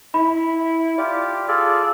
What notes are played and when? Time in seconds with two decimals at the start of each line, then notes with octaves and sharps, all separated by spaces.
0.14 E4 B5
0.98 F4 G4 D5
1.48 F4 G#4 A4 D5